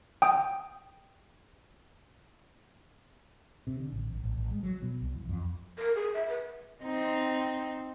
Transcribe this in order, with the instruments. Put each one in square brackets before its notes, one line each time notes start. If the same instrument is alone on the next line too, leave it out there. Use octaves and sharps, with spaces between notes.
[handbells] G5 D#6
[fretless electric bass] C3
D3
A1
A1
A1
A1
G#3
F#3
B2
C2
E2
F2
[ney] A#4
G#4
E5
B4
[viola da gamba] C4 D#4